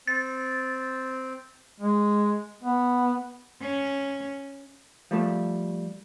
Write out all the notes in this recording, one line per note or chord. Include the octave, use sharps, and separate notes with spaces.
C4 A6
G#3
B3
C#4
F3 G3 A3